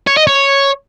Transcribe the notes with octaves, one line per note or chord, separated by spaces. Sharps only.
C#5
D#5
C#5